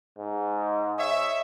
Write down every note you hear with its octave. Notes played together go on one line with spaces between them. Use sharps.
G#2
C#5 D#5 E5